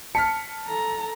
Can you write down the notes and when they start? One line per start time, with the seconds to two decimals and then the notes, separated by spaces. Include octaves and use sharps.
0.15 A5 F6 B6 C#7
0.67 A4 A#5